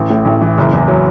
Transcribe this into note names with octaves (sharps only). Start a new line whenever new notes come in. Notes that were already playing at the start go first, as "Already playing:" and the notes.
Already playing: A1
A2
A1
E3
F#1
E2
F#3